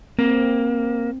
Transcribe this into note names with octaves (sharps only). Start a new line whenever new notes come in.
A#3 C4